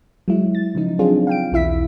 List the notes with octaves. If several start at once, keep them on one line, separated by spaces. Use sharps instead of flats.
F#3 G#3 E4
A6
C#3 F3 D#4
F#3 C4 D4 F4 G#4
F5 G5 D7
B1 E2 E4 E5 B6